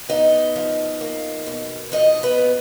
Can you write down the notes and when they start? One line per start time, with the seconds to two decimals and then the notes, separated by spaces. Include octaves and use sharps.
0.09 B3 D#4 D#5
0.56 F3
1.01 A#3
1.46 B2
1.92 F3 D#4 D#5
2.23 B3 B4
2.38 A#2